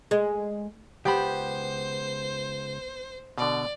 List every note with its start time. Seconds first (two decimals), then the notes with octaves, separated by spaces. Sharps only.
0.11 G#3
1.05 C#2 B3 G4 C5 B5
3.38 B2 D3 D5